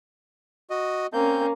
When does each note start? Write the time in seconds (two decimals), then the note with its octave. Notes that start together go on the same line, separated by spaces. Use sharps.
0.70 F#4 D#5
1.13 A#3 C4 C#4 G6